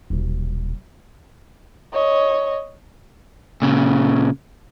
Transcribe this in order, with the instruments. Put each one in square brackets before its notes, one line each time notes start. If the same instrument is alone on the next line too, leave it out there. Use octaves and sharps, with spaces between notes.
[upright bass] D#1 B1
[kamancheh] C#5 D#5
[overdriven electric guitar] A#2 C#3